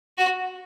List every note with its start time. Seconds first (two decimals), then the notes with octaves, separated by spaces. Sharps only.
0.18 F#4